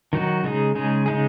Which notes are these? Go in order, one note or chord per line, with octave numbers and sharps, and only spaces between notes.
D#3 F#3 D#4 F#4
C#3 G#3 D#4 G#4
C#3 G#3 D#4 G#4
C#3 G#3 D#4 G#4